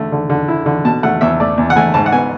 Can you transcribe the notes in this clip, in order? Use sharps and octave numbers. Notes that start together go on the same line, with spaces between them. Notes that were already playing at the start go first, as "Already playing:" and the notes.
Already playing: D3 A3
D3
D3
E4
D3
B2 A5
A3 F#5
E2 E5
A3 D5
E2
F#5
A3 G#5
G#2 A5
F#5
B3 G#5